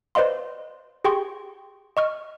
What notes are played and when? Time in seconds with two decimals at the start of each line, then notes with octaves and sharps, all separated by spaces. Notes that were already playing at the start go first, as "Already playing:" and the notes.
0.15 B4 C5 D5 D#5 F5 C6
1.04 G4 G#4 G5 C6 C#6
1.97 D#5 C#6 F6